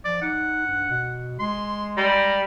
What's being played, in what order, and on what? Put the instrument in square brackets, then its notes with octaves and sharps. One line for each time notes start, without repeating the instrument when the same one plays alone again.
[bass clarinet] F3 [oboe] D5
[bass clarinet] D#4 [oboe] F#5
[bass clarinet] G2
B2
[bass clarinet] G#3 [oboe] C6
[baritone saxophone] G3 [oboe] A#5